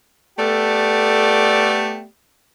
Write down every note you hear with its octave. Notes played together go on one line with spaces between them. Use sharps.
A3 B3 G4 A4 D5